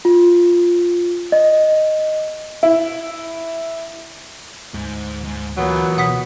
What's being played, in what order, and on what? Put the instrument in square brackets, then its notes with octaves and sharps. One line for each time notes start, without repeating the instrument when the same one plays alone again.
[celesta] F4
D#5
[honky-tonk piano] E4
[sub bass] D2 [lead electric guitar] G#2
[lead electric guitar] G#2
[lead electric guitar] E2 [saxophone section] A#2 F#3 B3
[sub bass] B2 [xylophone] F#5 D#6 B6